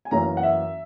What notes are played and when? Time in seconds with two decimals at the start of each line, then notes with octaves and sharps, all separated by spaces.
0.05 G#5
0.11 F#2 E3 A#3 C#4 A#5
0.37 F#5
0.43 E5